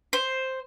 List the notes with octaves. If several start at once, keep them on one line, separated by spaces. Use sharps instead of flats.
C5